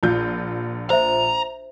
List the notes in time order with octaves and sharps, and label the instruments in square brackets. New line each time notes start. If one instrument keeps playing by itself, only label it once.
[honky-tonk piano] A#1 F4 G6
[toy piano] C5 E5 [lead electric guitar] A#5